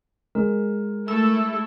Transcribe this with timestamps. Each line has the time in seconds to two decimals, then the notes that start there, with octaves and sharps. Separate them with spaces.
0.35 G#3 A#4
1.08 A3 E4 A4 E6